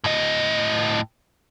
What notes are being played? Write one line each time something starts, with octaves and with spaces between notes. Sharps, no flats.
A2 D#5